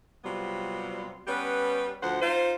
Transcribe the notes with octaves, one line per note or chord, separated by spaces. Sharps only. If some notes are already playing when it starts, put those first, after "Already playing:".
C3 F#3 G3 B3 F4
G3 B3 C#4 G4 B4
D2 F3 C5 F#5
D#4 F4 C5